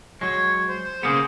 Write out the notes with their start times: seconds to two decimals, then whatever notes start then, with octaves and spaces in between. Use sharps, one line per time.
0.21 F#3 G#3 C#5
0.68 C5
1.03 C#3 A#3 B3 G#4